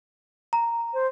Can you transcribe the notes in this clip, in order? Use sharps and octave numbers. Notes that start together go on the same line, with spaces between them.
A#5
C5